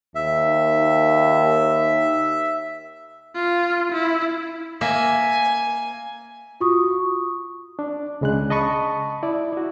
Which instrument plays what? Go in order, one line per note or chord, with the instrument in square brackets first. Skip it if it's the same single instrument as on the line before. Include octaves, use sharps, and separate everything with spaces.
[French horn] D#2 [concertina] E5
[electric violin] F4
E4
[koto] A#3 E5 [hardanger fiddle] G#5
[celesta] F4 F#4 C#6 D#6
[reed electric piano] D4
C#2 C#3 G#3 D4 F#6
D#5 A5 B5 C#6 D#6
E4 D5
E4 F#4